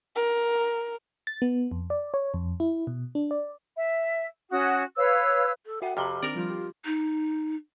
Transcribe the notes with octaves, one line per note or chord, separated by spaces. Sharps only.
A#4
A6
B3
F2
D5
C#5
F2
E4
B2
D4
D5
E5
C#4 F#4 D#6
B4 C#5 F5 E6
A4
F#4 E5 F#5 G5
F2 C3 G4 A#5 B5 F6
D#3 C4 D4 A#4 D5 D6
F3 G3 F4 F6
G4
D#4